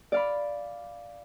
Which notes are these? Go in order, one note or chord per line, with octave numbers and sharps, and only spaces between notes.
D5 F5 B5